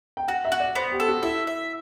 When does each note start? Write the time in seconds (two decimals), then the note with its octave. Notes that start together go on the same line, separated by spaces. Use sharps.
0.17 G5
0.28 F#4 F#5
0.45 E5
0.52 F#4
0.60 D5
0.75 B3 C5
0.92 G4
1.00 A4
1.08 F#4
1.23 E4 E5
1.47 E5